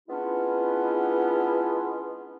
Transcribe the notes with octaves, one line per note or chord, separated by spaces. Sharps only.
G#3 B3 C#4 D4 E4 F4